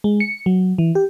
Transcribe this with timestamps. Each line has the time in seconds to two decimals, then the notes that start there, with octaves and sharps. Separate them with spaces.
0.04 G#3
0.20 C#7
0.46 F#3
0.78 E3
0.95 G4